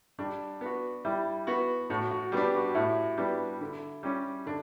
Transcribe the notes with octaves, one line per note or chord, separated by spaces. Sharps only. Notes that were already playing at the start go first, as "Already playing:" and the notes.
G3 D4
B3 F#4
G3 E4
B3 F#4
A2 F#4
F#4
G3 B3 D4 G4
F#4
A2 E4
G3 B3 D4
D3
G3 C#4 G4
D3 D4